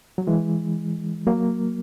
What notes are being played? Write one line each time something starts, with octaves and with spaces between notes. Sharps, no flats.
F#3
E3 G#3
F#3 A#3